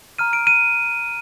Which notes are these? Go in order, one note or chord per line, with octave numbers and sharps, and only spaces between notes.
A#5 F6 D#7
D7
D#7